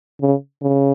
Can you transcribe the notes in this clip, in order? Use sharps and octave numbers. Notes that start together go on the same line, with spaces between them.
C#3
C#3